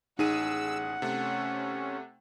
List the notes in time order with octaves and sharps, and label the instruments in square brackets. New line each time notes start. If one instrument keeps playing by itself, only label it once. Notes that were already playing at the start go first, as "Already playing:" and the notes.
[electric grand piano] A1 G#4 D#7 [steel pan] D#4 [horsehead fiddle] F#5 [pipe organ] E6
[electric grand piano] C3 A3 [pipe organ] C#4